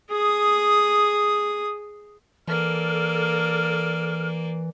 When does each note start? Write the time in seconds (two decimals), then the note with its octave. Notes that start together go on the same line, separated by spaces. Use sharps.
0.11 G#4 D#6
2.48 E3 A#3 A4 D5 F6